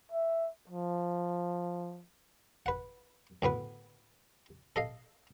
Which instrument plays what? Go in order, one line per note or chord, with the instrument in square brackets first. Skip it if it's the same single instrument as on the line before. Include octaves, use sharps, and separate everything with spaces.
[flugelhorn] E5
F3
[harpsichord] B4 F#5
D2 A2 B3 B4
A4 D#5 F5